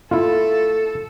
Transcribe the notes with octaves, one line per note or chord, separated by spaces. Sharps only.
A3 E4 F4 A4